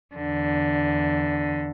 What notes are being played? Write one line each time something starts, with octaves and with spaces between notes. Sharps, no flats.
E2 D3